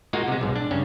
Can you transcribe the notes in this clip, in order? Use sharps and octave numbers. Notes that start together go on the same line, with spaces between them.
G#3 A#3 D#4 F4 F#4
C3 G#3
B1 G#2
D4
G2 C#3 C#4